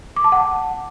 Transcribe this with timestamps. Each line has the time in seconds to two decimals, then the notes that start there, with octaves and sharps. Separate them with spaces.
0.17 D6
0.24 A5
0.32 F#5